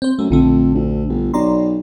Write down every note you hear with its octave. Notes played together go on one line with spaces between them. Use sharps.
C4 C5
F#2 A3
A#1 F2 D3 A3
D2
G1
B1 D5 A#5 C6